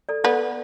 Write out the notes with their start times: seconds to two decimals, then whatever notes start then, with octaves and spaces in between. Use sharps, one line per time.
0.09 A4 D5
0.24 B3 A4 D5